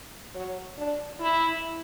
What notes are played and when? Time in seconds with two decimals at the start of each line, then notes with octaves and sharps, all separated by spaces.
0.35 F#3
0.78 D4
1.20 E4